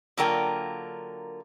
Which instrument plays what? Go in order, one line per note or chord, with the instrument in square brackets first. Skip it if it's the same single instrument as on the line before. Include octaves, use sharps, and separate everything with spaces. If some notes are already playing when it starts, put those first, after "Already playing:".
[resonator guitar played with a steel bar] D3 F#3 A#3 F4 A#4 G5